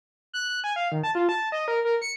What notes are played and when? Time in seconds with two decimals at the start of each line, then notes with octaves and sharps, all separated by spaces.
0.34 F#6
0.49 F#6
0.64 G#5
0.76 F5
0.92 D#3
1.04 A5
1.15 F4
1.29 A5
1.52 D#5
1.68 A#4
1.85 A#4
2.02 C#7